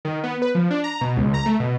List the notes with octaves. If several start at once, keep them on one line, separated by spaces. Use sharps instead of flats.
D#3
B3
B4
F3
D4
A#5
B2
C#2
A#5
A3
B2